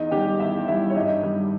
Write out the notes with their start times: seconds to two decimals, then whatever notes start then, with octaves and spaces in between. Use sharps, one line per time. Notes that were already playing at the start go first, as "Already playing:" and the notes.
Already playing: E2 D#4 D#5
0.11 D#3 G3 G4 G5
0.39 E2 E4 E5
0.67 D#3 G3 E4 E5
0.90 C#5
0.95 G2 D#4 D#5
1.23 D#3 G3